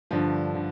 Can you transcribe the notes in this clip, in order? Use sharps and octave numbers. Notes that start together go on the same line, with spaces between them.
G2 D3 F3
D3